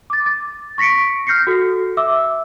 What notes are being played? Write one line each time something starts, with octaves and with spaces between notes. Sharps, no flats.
D6 A6
A6
C#6 A#6 B6 C#7 D7
F6 G6 A#6 C7 C#7
F#4 A4
E5 D6 E6